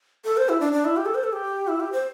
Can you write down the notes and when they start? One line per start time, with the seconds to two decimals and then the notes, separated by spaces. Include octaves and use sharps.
0.24 A4
0.37 C5
0.49 E4
0.60 D4
0.73 D4
0.85 E4
0.97 G4
1.06 A4
1.15 C5
1.24 A4
1.33 G4
1.68 E4
1.80 G4
1.92 C5